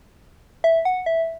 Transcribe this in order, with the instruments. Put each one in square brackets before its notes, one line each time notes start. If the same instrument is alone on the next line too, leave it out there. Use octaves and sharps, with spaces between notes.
[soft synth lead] E5
F#5
E5